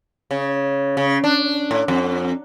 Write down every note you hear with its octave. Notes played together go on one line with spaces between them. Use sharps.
C#3
C#3
D4
A2
F2